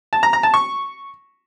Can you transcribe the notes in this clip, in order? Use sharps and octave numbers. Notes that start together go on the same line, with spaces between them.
A5
A#5
A#5
A5
C#6